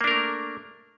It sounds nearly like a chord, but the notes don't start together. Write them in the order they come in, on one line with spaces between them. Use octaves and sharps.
A#3 D4 A#4 A3